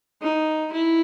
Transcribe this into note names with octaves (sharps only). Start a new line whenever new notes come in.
D#4
E4